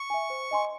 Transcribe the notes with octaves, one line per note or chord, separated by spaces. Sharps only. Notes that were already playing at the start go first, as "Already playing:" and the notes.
Already playing: C#6
E5 G#5
C5
D#5 G#5 C6